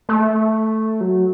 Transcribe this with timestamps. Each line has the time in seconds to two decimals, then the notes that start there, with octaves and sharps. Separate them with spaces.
0.09 A3
1.01 F#3